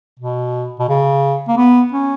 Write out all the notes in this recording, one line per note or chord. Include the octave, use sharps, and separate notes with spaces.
B2
B2
C#3
A#3
B3
C#4